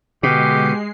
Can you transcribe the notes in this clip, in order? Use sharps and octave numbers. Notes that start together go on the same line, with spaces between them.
B2 D3 G#3 G4 C7